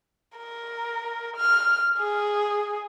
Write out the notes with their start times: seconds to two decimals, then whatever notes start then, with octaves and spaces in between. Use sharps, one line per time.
0.37 A#4
1.37 F6
1.99 G#4